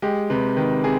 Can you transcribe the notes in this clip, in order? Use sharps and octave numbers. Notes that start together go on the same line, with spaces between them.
G#3 G4
C3 B4
D#3 B4
C3 G#4